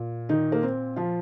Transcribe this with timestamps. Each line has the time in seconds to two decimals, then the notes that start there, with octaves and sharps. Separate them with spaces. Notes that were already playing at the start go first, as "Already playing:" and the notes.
Already playing: A#2
0.29 D#3 D#4
0.52 A#3
0.63 C4
0.96 F3 F4